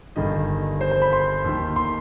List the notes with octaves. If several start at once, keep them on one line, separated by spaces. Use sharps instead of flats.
G1 G2 D#3 D#5
C5
C5
B5
C6
D#2 D#3
C6